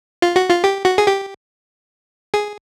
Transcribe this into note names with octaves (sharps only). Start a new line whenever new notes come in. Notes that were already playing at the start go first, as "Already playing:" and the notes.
F4
F#4
F4
G4
F#4
G#4
G4
G#4